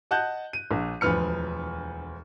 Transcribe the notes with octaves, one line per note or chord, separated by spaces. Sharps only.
D#5 F#5 A5 F#6 G6
D#7
A#1
E1 D2 F3 B4 F6 C#7